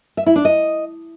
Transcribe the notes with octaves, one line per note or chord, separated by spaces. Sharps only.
E5
E4
D4
D#5